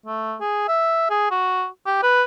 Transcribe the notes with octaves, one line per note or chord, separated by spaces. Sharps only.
A3
G#4
E5
G#4
F#4
G4
B4